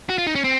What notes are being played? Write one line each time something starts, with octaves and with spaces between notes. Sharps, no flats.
F#4
F4
D#4
C#4
C4